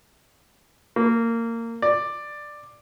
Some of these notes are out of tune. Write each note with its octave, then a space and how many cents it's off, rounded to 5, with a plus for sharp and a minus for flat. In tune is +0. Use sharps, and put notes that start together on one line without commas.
A#3 -20
D5 +10